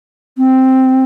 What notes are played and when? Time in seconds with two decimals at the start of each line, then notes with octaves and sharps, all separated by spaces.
0.38 C4